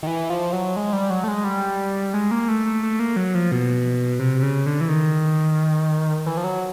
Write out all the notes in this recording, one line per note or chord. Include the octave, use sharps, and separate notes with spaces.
D#3
E3
F3
F#3
G#3
G3
F#3
A3
G#3
G3
G#3
A#3
A3
A3
A3
A#3
F#3
F3
B2
C3
C3
C#3
D3
E3
D#3
E3
F3
F#3